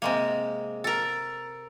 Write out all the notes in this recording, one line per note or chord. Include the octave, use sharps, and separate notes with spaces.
C3 G#3 A#3
A4 A#4